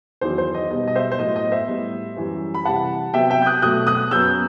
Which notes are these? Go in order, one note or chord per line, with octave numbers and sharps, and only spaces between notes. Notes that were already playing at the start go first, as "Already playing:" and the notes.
E2 D#3 F#3 C5
C5
D#5
B2 G3 B3 D#5
D#5
C5 E5
C5
A2 F#3 B3 D#5
D#5
C5 E5
A2 G3 B3
F#2 E3 G3
B5
C3 E3 G3 F#5 A5
C3 F#3 B3 E5 G5
E5 G5
G6
D#6 F#6
B2 F#3 A3 D#6 F#6
D#6 F#6
F#2 F#3 B3 E6 G6